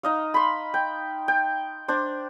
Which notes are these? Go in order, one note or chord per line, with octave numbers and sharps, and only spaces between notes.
D#4 D#5 F5
B5 C6
G5
G5
D4 C5